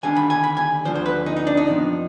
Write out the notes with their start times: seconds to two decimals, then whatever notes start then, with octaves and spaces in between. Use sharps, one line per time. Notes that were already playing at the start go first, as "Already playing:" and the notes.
0.03 D#2 D3 G3 D4 G#5
0.16 B5
0.30 G#5
0.44 B5
0.57 G#5
0.85 D2 D3 F3 C5
0.95 C5
1.06 B4
1.26 D#4
1.36 D#4
1.47 D4
1.57 D#4
1.67 F2 C3 F3 B3 D4